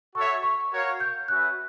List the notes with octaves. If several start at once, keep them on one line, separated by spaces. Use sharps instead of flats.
F#4 A4 C#5 E5 C#6
C#6
F#4 A#4 C#5 F5
G6
C#4 F#4 B4 E5 F#6